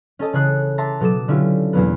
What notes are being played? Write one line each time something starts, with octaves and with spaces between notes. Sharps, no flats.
C#4 A4 D#5 A5
C#3 E3 C#5 D#6 F#6 C7
E5 A5 A#5 C6 D6
B2 F#3 A4 D6 D#6 E7
D3 C#4 E4 F4 G4
E2 B2 F#3 A#3 B3